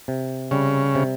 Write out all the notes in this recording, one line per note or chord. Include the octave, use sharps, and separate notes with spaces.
C3
C#3 G3
C3